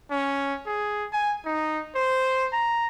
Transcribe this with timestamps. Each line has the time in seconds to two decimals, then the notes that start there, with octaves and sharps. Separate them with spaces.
0.11 C#4
0.66 G#4
1.13 G#5
1.45 D#4
1.95 C5
2.52 A#5